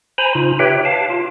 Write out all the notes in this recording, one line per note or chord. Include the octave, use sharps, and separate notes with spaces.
C5 G#5 A#5 B5
C#3 D#4 F4
G4 B4 C#5 E5 G5
F5 A5
F4